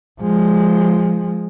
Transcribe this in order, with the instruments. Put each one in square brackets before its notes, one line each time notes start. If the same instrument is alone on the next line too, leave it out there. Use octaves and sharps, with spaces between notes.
[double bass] F3 G#3